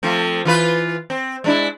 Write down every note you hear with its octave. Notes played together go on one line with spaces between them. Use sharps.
F3 A3 C4
E3 F4 B4
C4
G#3 D4 E4